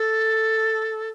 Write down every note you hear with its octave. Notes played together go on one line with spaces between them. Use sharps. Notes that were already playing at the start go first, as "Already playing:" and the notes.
Already playing: A4